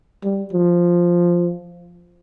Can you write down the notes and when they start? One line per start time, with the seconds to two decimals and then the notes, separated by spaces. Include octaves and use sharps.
0.24 G3
0.53 F3